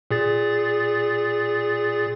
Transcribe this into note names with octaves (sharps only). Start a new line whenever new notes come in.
A#2 G#4 A6